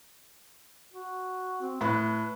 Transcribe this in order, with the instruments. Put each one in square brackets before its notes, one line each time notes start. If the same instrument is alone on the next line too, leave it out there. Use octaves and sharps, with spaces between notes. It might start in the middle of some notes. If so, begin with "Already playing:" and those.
[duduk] F#4
C4
[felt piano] A2 B5 F#6 [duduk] B4